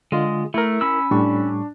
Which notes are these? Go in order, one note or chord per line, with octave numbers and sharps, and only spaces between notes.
D3 G#3 F4 D#5
A3 E4 A#4
C#4 B5 E6
A2 G3 D4 C#6